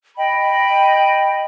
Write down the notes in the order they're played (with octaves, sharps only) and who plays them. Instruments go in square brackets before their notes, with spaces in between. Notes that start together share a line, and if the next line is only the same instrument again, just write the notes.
[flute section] D#5 G5 B5